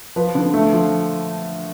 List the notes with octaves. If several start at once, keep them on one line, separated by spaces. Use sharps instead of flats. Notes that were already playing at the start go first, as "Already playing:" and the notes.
F3 B4
D3
A3
F3